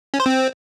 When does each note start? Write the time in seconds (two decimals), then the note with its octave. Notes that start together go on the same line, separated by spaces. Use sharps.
0.14 C#4
0.20 C5
0.26 C4